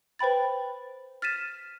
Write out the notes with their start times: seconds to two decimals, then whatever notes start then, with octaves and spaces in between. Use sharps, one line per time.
0.19 B4 C5 G5 B5 A6
1.22 F6 A6 B6 D#7 E7